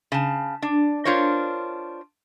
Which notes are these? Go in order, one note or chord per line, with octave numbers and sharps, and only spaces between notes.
C#3 A5
D4
D4 F4 A#4 C5 C#5